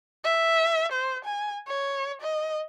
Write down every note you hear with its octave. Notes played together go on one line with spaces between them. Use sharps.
E5
C5
G#5
C#5
D#5